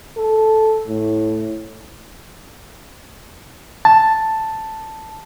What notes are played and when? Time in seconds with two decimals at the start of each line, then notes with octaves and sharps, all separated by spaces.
0.17 A4
0.87 A2
3.85 A5